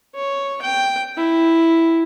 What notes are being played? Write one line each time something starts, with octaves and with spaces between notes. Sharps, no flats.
C#5
G5
E4